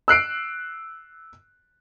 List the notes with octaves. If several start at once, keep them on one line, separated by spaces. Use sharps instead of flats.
E6 F#6 C7 D7